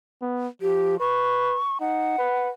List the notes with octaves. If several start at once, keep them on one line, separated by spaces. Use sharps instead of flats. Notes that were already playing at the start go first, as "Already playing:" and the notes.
B3
F3 G4
B4 C#6
D#4 F#5
B4